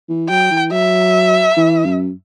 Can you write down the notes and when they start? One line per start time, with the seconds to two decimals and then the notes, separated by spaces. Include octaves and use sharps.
0.09 E3
0.29 F#3 G5
0.51 E3
0.72 F#3 E5
1.57 E3
1.85 F#2